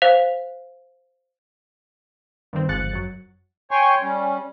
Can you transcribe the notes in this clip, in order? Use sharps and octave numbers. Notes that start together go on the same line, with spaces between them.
C5 F5 F7
G2 D#3 C4
G1 G#2 F3 F#6 A6 C#7
F#2 F#3
C#5 G5 G#5 C6 C#6
G3 C#4